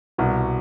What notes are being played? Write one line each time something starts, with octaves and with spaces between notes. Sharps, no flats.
C2 B2 B3